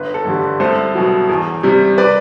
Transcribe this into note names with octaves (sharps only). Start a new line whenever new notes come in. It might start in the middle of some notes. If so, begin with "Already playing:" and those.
Already playing: G1 B4
A4
G2 D3 G3
C2 A4 C5
B2 F#3
E2
C3 G3
B4 D5